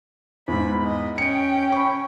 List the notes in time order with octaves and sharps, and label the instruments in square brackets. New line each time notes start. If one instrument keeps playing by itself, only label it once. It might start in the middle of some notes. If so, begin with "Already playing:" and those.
[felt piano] E2 G#2 [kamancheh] B5
[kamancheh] D#5
[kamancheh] C#4 G5 [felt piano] C#7 D7
[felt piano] B5 C#6